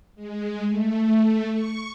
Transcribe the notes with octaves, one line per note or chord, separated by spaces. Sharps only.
G#3
A3
C#6